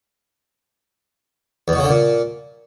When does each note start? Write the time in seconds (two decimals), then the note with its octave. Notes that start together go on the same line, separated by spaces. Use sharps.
1.68 E2
1.73 B2
1.78 C#3
1.84 D3
1.89 A#2